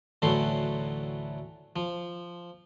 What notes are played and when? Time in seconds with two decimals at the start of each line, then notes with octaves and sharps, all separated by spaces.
0.22 D2 A2 E3 F#3 A4 C6
1.76 F3